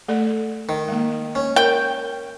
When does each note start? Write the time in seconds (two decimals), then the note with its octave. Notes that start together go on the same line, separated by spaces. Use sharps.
0.08 A3 A4 D5
0.69 D#3
0.88 G#3 A#3
1.35 C#4
1.56 A#4 G5